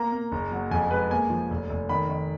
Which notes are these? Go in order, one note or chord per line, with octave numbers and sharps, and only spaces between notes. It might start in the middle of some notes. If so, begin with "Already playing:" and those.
Already playing: A#3 A#5
A#3
F#1
F#3
F2 G#5
G#3 B4
A#3 G#5
F3
F1
F1
D#3 B5
D#3